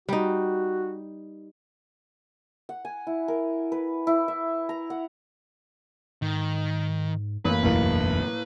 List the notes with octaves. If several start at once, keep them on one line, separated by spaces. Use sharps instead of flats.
G3 D#4 F#4
F#5
G#5
E4
A#4
B4
E4
E5
A#5
F#5
G#2 D#3
A1 F#2 A#3 B4
E1 B1 E2 A2 A#3